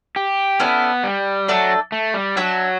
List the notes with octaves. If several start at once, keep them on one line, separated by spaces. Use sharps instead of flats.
G4
B3 C#4 E4 A4 D5
G3
F#3 A3 D4 A4 D5
A3
G3
F#3 D4 F#4 C#5 E5